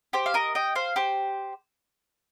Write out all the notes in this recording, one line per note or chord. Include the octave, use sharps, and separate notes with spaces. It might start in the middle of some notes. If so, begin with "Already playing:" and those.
G4 C5
F5
A#4 D#5
D#5 G5
C5 F5
G4 C5